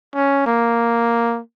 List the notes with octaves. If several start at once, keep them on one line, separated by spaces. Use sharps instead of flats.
C#4
A#3